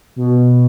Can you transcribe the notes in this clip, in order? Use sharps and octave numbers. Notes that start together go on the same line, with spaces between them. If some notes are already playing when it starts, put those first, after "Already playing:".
B2